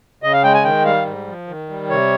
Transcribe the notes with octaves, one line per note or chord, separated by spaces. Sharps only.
C#3 D#5
F5
G#3 G5
G#5
D#3 G5
G3 F5
G#2
F3
D#3
G3
C3 C#5